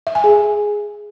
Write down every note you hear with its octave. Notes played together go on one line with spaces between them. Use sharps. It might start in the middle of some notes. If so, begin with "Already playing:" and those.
E5
G#5
G#4